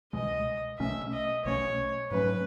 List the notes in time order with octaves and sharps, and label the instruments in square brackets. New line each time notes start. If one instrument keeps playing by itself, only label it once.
[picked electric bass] C#2 B2 G#3 [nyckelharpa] D#5
[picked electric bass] B1 B2 A3 C#4 [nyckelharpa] E5
[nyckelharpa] D#5
[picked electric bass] B1 B2 A3 C#4 [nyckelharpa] C#5
[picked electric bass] G#2 F#3 A3 C#4 [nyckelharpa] B4